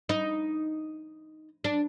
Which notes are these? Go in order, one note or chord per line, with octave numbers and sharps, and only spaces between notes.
D#4
D4